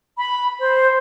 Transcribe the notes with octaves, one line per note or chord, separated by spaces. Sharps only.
B5
C5